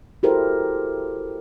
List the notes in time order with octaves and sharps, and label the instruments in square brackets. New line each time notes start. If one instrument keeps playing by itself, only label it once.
[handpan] E4 F#4 G4 A4 A#4 C5